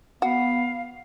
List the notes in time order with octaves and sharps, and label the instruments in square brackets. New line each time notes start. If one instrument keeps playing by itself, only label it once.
[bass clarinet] B3 [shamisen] F#4 [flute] F5